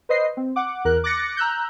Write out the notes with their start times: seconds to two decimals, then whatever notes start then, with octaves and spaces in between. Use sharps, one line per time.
0.09 B4 C5 D#5 C7
0.37 C4
0.56 F#5 D6
0.85 E2 A#4 F#6
1.04 D6 F#6 A6 A#6 C#7
1.37 A#5 E6 F#6 G6